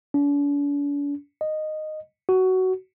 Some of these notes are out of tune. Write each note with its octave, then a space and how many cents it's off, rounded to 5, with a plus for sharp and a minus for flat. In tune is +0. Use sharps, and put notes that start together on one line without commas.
D4 -45
D#5 -10
F#4 +15